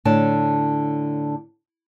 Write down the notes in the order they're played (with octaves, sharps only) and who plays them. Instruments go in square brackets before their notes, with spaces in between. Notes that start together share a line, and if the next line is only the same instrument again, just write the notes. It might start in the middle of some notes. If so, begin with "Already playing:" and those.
[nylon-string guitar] A2 D3 C#5 A5